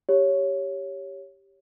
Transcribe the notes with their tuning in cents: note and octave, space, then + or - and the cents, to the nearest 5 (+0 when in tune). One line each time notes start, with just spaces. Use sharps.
G4 +0 C#5 +0